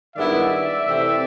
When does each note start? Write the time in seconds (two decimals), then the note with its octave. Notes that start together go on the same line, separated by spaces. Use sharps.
0.16 G2 D#3 G#3 B3 E4 D5 E5
0.85 C3 E3 A3 C4